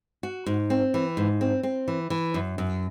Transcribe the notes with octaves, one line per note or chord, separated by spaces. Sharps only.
F#4
G#2
C4
E3
G#2
C4
C4
E3
E3
F#2
F#2